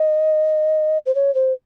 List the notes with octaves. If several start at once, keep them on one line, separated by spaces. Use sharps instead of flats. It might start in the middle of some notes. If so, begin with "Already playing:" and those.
Already playing: D#5
C5
C#5
C5